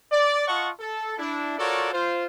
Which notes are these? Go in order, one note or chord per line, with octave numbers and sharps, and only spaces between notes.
D5
F4 D#5 F#5 A5 C#6
A4
D4 E4
F4 F#4 A4 A#4 C#5 D5
F4 C5